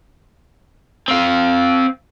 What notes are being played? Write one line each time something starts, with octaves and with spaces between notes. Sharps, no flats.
C4 F5